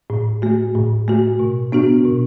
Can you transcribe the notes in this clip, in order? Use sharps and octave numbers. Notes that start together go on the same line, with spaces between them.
A2
A3 F#4
A2
A3 F#4
B2
B3 D4 F#4
B2